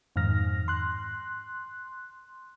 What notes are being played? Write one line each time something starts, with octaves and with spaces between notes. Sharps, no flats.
F2 G#2 D#3 F6 A#6
C6 F#6